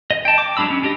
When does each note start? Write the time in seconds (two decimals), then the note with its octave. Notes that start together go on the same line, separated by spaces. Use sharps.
0.11 D#5
0.25 G5 A5
0.38 D6
0.57 F#3 G#3 D4 B5 E6
0.70 C#4
0.83 D4 G4 D#5